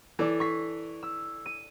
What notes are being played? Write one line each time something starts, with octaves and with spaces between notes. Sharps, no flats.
E3 A4 D5
C#6 B6 C7
E6
D#7